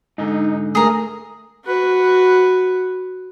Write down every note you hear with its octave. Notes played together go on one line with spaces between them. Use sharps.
G#2 D3 D#4
A3 G#4 A#4
F#4 B4